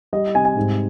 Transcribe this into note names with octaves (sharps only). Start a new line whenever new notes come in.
G3 D#5
C3 G#5
G#5
G#2